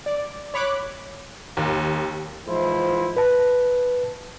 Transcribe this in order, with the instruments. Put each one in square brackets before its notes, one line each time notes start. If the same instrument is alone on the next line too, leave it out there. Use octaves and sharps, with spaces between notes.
[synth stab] D5
C#5 B5 D6 F#6
[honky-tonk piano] D#2
[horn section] G#2 E3 F3 E4 C5
[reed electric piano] B4 A5